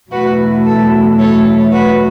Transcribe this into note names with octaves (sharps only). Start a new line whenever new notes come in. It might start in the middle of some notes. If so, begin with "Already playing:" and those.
E2 B2 F#3 A3 E4 F#4 B4
A4
A4 C#5
F#4 B4